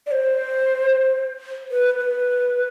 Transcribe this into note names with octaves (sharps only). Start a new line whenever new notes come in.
D5
C5
B4
B4